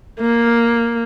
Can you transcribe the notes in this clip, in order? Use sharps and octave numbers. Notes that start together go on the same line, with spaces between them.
A#3